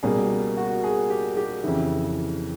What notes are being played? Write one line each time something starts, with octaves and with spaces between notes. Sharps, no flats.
C#2 B2 G3 A#3 G#4
F#4
G#4
G4
G4
F2 C#3 E3 E4